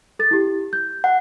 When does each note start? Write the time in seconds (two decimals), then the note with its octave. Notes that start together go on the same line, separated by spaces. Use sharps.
0.19 A4 A6
0.31 E4 G4
0.73 G6
1.04 F#5